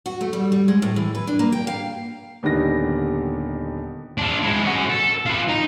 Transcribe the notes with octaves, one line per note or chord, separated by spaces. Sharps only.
F#4
A3
G3
G3
G#3
A2
E3
B4
D4
A#3
G5
F5
D#1 D3 D#3 B3 G4 A#6
D4 F4
G#3 E4
C#4 F#4
A4
F4 B4
D#4